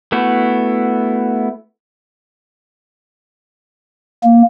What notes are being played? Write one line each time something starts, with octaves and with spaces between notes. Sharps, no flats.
A3 B3 E4 F#4
A#3